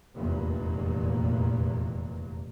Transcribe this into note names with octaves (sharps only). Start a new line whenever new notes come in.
F1 E2 G2 A#2 A#3